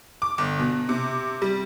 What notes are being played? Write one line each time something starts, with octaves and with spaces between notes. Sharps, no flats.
D6
G1
B2
C3
G3